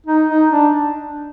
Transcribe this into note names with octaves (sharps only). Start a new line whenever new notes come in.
D#4
D#4
D4